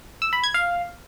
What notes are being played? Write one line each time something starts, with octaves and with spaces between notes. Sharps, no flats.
E6
B5
G#6
F5